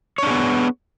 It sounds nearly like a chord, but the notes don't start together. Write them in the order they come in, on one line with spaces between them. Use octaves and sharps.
C#5 D4 G#4 B3